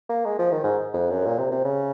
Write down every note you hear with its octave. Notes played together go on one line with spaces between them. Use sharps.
A#3
G#3
F3
D#3
G#2
F2
F#2
A#2
C3
C3
C#3